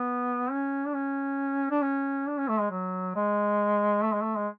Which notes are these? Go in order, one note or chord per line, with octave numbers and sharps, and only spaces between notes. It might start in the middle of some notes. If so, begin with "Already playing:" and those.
Already playing: B3
C#4
D4
C#4
D4
C#4
D4
C#4
A3
G#3
F#3
G#3
A3
G#3
A3
G#3